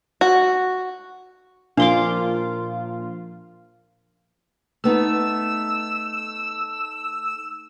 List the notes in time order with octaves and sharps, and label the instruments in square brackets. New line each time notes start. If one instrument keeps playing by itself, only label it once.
[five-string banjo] F#4
[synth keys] A#2 F3 F4 [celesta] D4 [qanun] F5 C6 D6
[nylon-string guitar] A3 B3 D#4 [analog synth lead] E6